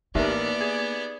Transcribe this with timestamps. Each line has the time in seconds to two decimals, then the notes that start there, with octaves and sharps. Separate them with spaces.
0.15 A1 A#3 B3 D#4 G4 A#4 D5 E5
0.61 G#4 G#6